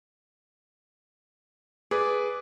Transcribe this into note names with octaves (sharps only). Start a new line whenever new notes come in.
G#4 B4 D5